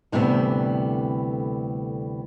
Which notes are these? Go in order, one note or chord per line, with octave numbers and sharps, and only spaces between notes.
D2 A2 C3 E3 G3 B3